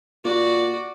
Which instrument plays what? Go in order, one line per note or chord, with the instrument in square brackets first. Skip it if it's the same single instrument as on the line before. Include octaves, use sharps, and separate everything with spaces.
[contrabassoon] A#2 [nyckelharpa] F#4 D5